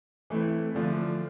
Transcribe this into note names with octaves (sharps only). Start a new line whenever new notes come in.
E3 A3 C4 E4
D3 F3 A3 D4 F4